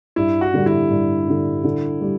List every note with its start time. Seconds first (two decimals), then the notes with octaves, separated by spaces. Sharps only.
0.16 G2 E4
0.41 F#4
0.54 D3 G3
0.66 E4
0.90 G2
1.28 D3 G3
1.64 D3
2.01 G3